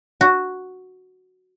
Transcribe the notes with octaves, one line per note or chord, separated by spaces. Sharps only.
F#4